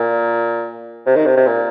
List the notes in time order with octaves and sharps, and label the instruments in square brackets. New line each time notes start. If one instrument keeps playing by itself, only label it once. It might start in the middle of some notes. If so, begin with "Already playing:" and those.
Already playing: [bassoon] A#2
C3
D#3
C3
C3
A#2